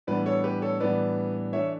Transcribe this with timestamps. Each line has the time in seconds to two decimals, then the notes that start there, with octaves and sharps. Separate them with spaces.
0.07 A2 E3 G3 B3 D4 B4 D5
0.26 A4 C#5
0.44 G4 B4
0.62 A4 C#5
0.80 A2 E3 G3 B3 D4 B4 D5
1.53 E3 A3 D4 C#5 E5